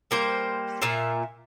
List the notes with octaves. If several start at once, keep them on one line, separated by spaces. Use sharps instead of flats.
G3 A#3 C5
A#2 A#3 F4 E5